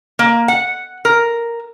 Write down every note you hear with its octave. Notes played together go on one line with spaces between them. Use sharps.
A#3
F#5
A#4